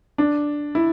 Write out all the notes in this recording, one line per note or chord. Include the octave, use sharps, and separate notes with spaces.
D4
E4